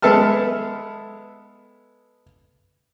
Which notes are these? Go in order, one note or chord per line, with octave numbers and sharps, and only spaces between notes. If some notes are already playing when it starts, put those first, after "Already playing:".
G#3 B3 A4 E5 A5 F6